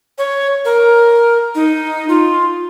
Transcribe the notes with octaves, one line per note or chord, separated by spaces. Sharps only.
C#5
A#4
D#4
F4